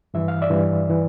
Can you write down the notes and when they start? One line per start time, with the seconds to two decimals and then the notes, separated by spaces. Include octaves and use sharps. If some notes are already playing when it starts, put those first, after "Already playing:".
0.14 G2 E3 E5
0.28 F5
0.42 D5 E5
0.50 G2 E3
0.89 E3